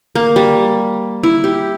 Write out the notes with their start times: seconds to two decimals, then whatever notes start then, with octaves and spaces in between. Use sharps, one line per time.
0.15 A#3
0.36 G3
1.23 E4
1.44 G4